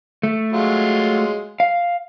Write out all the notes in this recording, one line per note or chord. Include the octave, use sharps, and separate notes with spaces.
A3
F#3 G#3 F4
F5